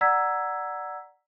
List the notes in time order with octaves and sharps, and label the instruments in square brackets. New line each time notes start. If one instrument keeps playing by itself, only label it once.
[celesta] D5 F#5 A#5 E6 G#6 B6